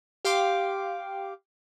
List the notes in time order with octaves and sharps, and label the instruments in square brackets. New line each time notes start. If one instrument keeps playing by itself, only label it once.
[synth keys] G4 F5 G5 C6 D6